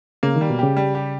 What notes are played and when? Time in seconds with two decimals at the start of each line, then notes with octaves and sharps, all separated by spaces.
0.23 C#3 A#3
0.36 D#3
0.41 G3
0.50 B2
0.59 C#3 G4
0.77 G3
0.95 G4